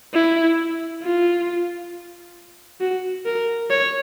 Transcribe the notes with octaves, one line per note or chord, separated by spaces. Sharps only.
E4
F4
F#4
A#4
C#5